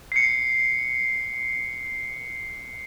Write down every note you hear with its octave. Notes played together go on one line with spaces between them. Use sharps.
C7 C#7